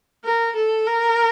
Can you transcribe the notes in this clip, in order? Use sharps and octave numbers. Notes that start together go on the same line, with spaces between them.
A#4
A4
A#4